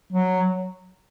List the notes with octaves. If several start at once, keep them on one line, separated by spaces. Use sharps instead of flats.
F#3